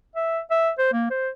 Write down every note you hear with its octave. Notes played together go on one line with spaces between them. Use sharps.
E5
E5
C5
A#3
C5